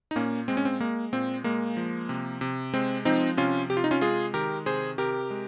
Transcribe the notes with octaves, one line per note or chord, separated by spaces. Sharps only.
D#4
A#2 A#3 C#4
G#3 C4
C#4
C4
G#3 A#3
A#2 C4
G#3 A#3
F3
C3
C3
G#3 C4
F3 C4 D#4
C3 C#4 F4
C3 G4
F4
D#4
C#4 F4
G#3 F4 G#4
D#3 G4 A#4
C3 G#4 C5
C3 G4 A#4
G#3